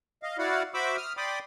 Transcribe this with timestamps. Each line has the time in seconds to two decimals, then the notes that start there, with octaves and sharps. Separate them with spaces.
0.23 D#5 F5
0.38 E4 F#4 D5 F5 F#5
0.74 F#4 C5 E5 B5 D6 E6
0.97 D#6 F6
1.17 D5 G5 B5 C6 D6 D#6